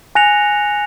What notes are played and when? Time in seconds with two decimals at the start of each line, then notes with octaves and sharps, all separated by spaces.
0.15 G#5 F#6 A#6 C#7 F7